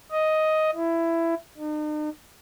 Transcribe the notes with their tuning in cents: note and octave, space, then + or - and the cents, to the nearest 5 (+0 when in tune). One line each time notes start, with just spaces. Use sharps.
D#5 +5
E4 +15
D#4 -45